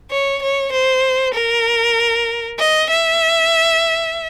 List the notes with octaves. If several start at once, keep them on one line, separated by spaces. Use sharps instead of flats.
C#5
C#5
C5
A#4
D#5
E5